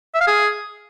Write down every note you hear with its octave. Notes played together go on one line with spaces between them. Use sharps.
E5
F5
G#4